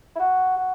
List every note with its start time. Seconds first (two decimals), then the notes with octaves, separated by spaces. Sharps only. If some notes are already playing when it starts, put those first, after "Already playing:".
0.16 E4
0.19 F#4
0.57 F#4